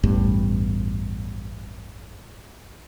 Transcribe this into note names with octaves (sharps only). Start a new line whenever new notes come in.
A1 E2 G2